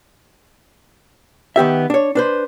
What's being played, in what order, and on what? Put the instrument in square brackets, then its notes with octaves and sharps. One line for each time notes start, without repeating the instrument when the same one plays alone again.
[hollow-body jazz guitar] D#3 B3 G4 E5
D4 C#5
D4 B4 C5